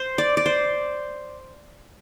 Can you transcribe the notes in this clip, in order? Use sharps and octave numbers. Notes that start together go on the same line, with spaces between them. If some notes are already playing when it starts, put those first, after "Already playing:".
Already playing: C5
D5
D5
C5